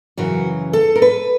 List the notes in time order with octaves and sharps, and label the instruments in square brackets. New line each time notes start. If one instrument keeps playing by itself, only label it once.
[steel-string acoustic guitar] F#2 C#3 E3 F#4
A4
A#4
B4